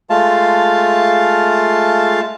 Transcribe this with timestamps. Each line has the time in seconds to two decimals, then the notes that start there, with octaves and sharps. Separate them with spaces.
0.10 G#3 A3 F4 F5 A5